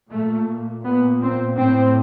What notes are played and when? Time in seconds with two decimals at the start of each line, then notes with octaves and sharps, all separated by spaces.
0.10 A#2 A3
0.84 A#2 B3
1.21 C4
1.57 A2 C4